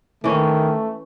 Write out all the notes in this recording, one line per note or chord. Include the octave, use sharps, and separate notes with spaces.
D#3 E3 A3 C#4